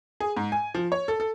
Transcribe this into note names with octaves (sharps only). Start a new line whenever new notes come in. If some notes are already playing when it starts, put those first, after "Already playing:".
G#4
G#2
G#5
F3
C#5
A4
A4